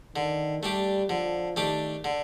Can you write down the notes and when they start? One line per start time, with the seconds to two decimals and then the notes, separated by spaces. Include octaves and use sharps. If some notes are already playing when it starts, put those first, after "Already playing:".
0.16 D3 D#3
0.62 G3 A3 D4 G4
1.09 D3 F3
1.56 D#3 A3 D4 G4
2.04 D3